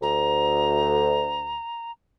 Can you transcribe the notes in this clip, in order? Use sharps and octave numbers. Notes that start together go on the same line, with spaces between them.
D2 A#5